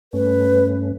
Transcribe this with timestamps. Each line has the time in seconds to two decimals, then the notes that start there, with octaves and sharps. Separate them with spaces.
0.13 G2 A3 C#4 B4